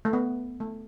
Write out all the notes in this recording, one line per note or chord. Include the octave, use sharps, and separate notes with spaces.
A3
B3
A3